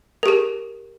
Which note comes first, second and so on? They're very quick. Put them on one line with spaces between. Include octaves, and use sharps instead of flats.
A#4 G4 G#4